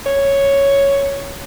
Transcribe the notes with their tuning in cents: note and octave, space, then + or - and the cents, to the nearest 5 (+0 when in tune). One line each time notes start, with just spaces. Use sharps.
C#5 +0